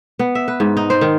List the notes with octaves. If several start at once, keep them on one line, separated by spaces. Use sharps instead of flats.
B3
E5
B4
G#2
D#4
C5
D#3